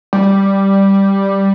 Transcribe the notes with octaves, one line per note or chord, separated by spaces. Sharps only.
G3